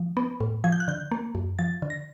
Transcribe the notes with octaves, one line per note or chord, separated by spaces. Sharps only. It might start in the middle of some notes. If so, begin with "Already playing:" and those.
Already playing: F3
B3
A2
F3 G#6
G6
F#6
D3 G6
A#3
F#2
F3 A6
D3
A#6